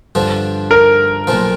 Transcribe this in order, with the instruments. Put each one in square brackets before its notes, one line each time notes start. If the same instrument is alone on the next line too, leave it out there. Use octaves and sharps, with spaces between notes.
[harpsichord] G2 D3 F3
[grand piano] A#4
[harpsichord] B1 A#2 F3